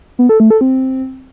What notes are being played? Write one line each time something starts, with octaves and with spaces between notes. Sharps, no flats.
B3
A4
A3
A4
C4